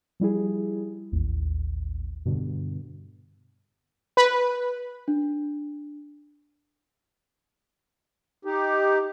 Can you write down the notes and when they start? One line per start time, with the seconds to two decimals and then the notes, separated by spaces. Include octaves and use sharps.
0.20 F3 G3 E4 G#4
1.12 A1 D#2
2.26 G2 B2 D3
4.17 B4
5.08 D4
8.45 D#4 G4